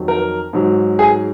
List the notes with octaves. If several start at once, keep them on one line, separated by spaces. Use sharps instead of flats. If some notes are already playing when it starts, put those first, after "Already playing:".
Already playing: F2 D#3 F#3
A#4
G#2 F#3
G#4